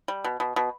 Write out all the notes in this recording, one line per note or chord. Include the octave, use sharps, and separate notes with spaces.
G3
B2
B2
B2